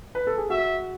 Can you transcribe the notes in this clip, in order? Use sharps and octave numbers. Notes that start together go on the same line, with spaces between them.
B4
A4
G#4
F#4 E5